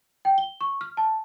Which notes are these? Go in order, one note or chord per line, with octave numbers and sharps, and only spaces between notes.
G5
G7
C#6
F6
A5